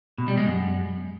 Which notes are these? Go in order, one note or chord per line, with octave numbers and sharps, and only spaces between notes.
B2
G3
G#3
F#2